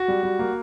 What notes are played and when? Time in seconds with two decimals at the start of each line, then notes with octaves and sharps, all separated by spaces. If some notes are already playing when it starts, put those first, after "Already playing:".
Already playing: F#4
0.08 G3
0.23 G3
0.39 A#3